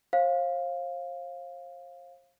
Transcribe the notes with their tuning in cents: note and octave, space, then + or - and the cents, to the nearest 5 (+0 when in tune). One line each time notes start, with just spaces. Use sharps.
C5 +40 F5 +0